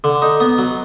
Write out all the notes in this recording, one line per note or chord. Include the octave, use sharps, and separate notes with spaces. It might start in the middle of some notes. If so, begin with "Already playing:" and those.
D3
D#4
B3
F#3